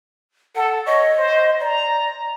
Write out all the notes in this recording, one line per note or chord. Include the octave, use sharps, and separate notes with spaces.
A4 F#5
C#5 D#5
C5
D5 A#5